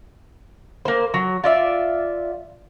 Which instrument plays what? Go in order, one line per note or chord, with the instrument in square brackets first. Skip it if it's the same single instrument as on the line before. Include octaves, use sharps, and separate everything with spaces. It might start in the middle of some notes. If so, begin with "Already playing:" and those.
[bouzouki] A#3 C5
F#3
F4 D5 E5